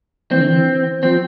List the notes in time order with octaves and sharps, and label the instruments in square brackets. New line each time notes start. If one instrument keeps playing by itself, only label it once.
[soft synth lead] E3 [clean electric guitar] C4
[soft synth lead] D3
E3
[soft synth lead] F3 [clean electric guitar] C4